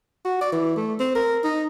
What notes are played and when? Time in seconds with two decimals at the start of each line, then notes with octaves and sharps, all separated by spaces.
0.25 F#4
0.41 D5
0.52 E3
0.77 A3
1.00 C4
1.15 A#4
1.44 D#4